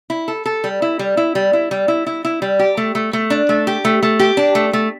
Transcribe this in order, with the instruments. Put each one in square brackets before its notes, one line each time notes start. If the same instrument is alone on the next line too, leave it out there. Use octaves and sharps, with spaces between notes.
[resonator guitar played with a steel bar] E4
A4
A4
G3
E4
G3
E4
G3
E4
G3
E4
E4
E4
G3
G4
A3
A3
A3
D4
A3
G4
A3
A3
G4
D4
A3
A3